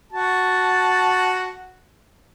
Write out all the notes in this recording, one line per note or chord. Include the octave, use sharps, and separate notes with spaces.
F#4 A5